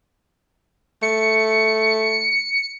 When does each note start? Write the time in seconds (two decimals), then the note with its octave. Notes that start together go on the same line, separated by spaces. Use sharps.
1.02 A3 C#7